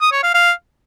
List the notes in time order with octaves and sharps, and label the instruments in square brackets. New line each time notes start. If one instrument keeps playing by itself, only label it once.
[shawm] D#6
C#5
F5
F5